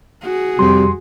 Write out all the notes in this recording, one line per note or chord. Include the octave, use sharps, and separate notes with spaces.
F#4 G#4
F2 C3 G3 C6